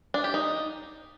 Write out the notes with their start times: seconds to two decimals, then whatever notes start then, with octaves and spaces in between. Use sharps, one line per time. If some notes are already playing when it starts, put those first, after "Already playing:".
0.14 D4
0.24 G4
0.34 D#4